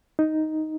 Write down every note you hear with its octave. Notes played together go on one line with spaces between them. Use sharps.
D#4